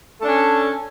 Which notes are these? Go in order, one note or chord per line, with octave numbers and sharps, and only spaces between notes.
C#4 D4 A4